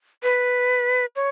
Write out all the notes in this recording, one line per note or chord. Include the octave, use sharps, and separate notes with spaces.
B4
C#5